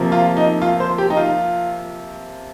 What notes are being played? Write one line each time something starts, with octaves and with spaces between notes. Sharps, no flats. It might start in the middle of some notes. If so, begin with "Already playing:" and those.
Already playing: C3 F3 A#3
F4
D#4
F4
C5
G4
D#4
F4